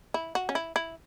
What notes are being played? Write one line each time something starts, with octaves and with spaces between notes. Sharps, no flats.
E4
F#4
C#4
E4
E4